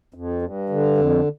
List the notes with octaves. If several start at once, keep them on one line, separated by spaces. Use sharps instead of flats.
F2
G2
D3
F2